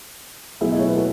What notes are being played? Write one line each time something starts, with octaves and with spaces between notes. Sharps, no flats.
B2 F#3 A3 E4 G#4
D#5
C#5
B4
F#4 A4